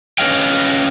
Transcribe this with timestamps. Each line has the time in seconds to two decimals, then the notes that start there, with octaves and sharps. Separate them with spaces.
0.18 C#4 B4 C#5 D#5 F5 G5